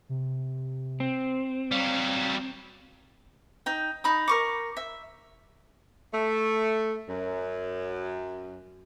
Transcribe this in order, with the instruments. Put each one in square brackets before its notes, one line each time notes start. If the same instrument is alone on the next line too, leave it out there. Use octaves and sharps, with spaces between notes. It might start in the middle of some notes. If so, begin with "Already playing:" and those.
[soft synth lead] C3
[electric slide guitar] C4
[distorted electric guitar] F#3 G3 [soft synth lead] F5
[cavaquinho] D#4 G5
D#4 B5 D#6
A#4 C#6 D6
E5
[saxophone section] A3
F#2